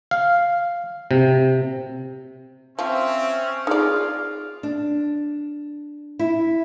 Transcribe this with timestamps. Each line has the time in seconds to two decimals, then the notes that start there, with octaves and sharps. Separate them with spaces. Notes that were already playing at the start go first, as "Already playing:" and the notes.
0.11 F5
1.11 C3
2.79 F3 C4 C#4 E5
3.67 D#4 F4 G#4 D5 F5
4.63 D4
6.19 E4